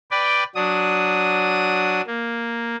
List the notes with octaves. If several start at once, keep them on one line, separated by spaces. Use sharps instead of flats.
B4 D5 G5
F#3 D4 D#6
A#3